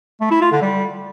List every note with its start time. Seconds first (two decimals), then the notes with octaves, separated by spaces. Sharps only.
0.21 A3
0.31 E4
0.41 F4
0.52 D3
0.62 G3